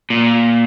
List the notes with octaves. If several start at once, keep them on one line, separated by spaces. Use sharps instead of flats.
A#2